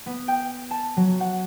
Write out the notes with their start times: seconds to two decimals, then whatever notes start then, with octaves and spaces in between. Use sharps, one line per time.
0.06 B3
0.28 G5
0.71 A5
0.97 F#3
1.20 F#5